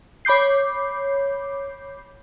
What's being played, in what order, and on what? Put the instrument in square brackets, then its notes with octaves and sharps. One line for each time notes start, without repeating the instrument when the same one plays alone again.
[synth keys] C#5 B5 D6 G6 C7